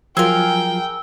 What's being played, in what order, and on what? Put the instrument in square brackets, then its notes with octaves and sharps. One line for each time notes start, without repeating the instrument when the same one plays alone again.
[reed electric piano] F3 F#3 F4 [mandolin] G#4 A#4 [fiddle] G5 [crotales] E6